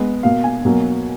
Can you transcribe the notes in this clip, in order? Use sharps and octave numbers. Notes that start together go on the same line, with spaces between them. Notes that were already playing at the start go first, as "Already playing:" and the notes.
Already playing: G#3 B3
B2 A#3 F5
G#5
B2 F#3 A#3